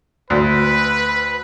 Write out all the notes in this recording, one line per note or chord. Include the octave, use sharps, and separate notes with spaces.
D2 B4